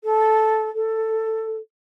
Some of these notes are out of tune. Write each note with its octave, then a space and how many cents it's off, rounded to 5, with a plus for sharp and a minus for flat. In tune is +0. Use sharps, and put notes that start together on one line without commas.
A4 -10
A4 +10